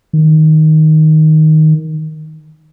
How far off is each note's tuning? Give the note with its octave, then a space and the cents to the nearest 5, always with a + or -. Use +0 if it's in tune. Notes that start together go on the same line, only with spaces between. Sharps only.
D#3 +5